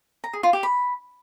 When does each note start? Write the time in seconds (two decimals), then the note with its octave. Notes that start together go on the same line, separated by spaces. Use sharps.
0.24 A#5
0.33 G#4
0.43 F4
0.53 G4
0.63 B5